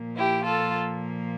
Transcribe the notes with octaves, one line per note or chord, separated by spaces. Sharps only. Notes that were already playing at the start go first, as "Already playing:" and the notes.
Already playing: A#2 F3 A#3
E4 G4
F4 A4